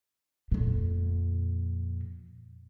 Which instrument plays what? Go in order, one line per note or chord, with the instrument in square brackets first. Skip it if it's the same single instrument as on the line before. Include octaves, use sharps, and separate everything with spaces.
[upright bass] F2 A#2